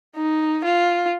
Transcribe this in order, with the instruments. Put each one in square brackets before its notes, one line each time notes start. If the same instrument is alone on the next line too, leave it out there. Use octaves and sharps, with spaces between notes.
[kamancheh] D#4
F4